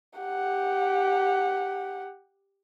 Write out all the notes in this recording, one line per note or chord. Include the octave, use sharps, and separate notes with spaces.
G4 F#5